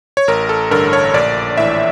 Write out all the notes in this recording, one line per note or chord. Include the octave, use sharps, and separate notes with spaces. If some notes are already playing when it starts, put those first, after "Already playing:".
C#5
A1 A#4
A4
G2 D3 A#4
C#5
A#1 D5
A2 E3 E5